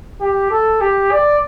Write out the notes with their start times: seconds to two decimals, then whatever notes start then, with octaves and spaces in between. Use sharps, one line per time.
0.21 G4
0.51 A4
0.81 G4
1.12 D5